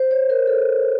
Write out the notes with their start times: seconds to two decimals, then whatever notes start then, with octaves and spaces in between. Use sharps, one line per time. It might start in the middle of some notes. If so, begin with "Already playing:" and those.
Already playing: C5
0.11 C#5
0.30 A#4
0.47 A4